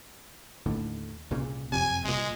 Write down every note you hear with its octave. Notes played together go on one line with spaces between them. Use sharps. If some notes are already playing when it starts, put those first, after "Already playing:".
D#2 A2 D3
C2 A#2 C#3
F#1 F2 C3 G#5
C2 A#2 G#3